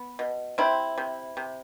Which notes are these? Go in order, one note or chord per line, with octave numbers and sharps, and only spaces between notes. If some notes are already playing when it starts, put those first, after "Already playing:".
Already playing: B3
B2
C3 C4 E4
C3
C3